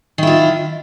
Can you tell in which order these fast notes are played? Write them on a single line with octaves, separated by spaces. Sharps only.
D#3 E4 F4